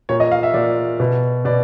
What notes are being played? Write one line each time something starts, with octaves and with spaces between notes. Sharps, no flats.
A#2 C#5
D#5
F5
E5
A#2 D5
B2
B2 D5